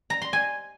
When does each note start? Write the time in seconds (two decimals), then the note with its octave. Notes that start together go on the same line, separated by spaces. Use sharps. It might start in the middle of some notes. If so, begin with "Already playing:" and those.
0.10 A#5
0.22 C6
0.33 G#5